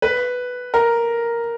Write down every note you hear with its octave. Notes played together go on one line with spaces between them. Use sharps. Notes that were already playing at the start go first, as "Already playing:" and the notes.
B4
A#4